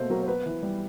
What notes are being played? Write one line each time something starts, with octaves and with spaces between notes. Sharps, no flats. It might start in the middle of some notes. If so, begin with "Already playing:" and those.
Already playing: B2 A3 A#3 C5
F#3 A#4
C5
B3 B4
E3
G3